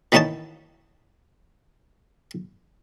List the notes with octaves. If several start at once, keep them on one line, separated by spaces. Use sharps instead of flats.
D#3 E3 A#3 C#4 D#4 A5